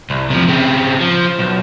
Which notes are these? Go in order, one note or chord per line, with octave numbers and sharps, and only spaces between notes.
C2
C3 F3
C#3 C4
F3
B1